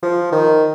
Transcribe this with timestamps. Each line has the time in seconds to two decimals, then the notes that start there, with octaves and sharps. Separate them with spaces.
0.03 F3
0.32 D#3